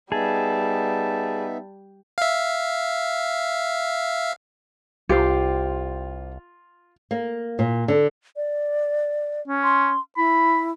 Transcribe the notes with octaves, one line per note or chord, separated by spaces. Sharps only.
G3 B3 D#4 G#4 E5 A5
E5 F5
C2 F4 G4 C5
A#3
A#2
D3
D5
C#4
C6
E4 B5